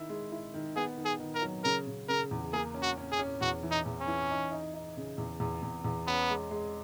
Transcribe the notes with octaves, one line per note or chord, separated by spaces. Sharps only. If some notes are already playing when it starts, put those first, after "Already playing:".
Already playing: D#3 E4
G#3
E4
D#3
B3 G#4
D#3
G#4
D#3
A#4
F#3
C#3 A#4
C#3
C#3 A#4
E2
A#3 G#4
C#4
F#4
C#4
G#4
C#4
E2 F#4
E3
D#4
E2
C#4
E3
D#4
D#4
D#4
C#3
E2
E2
E2
E2
B3 C#4
G#3
G#3